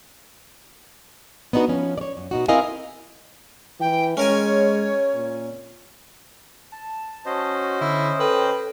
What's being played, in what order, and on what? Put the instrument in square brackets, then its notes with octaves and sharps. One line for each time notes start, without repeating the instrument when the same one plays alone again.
[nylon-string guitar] B3 D4 D#4 F#4 B4
F3 C#4
C#5 D5
F#2
B2 D#4 F#4
C4 E4 A#4 D#5 F5 G#5
[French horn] E3 [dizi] G5
[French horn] G#3 [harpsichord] C#4 A#4 G#5 [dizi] C#5
[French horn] A#2
[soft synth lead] A5
[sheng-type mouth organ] C#4 C5 D#5 [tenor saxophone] F#4
[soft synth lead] D3 [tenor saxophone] E4
[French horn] A4 [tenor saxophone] B4 [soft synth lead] G5